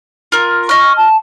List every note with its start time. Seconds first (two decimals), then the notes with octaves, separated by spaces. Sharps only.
0.32 F4 A#4
0.69 D#5 C#6 F6
0.97 A5